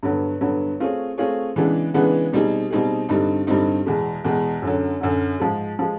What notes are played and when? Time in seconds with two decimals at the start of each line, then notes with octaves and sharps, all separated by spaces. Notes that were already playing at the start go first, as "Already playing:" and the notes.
0.03 G2 D3 F#3 B3
0.41 G2 D3 F#3 B3
0.80 A3 C4 F4 G#4 C#5
1.18 A3 C4 F4 G#4 C#5
1.56 C#3 E3 G#3 B3 D4
1.94 C#3 E3 G#3 B3 D4
2.33 B2 G3 C4 D#4 G#4
2.70 B2 G3 C4 D#4 G#4
3.09 G2 D3 G3 C4 D#4
3.47 G2 D3 G3 C4 D#4
3.86 E2 B2 G#3
4.24 E2 B2 G#3
4.62 F#2 D3 F#3
5.00 F#2 D3 F#3
5.40 G#2 F3 G#3
5.79 F3 G#3